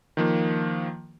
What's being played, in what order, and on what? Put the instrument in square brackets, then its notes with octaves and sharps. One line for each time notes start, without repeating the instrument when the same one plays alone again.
[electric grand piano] D#3 F3 A#3